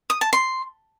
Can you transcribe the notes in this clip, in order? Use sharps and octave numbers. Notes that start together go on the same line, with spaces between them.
D#6
A5
C6